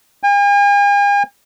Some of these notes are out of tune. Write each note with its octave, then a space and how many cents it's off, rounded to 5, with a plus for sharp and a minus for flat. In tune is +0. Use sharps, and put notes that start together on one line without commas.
G#5 -45